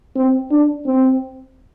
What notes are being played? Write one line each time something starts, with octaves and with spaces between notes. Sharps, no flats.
C4
D4
C4